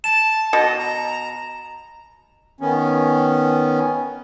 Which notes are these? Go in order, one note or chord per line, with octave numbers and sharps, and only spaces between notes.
A5 E7
B2 D#5
A#5
D#3 B3 C#4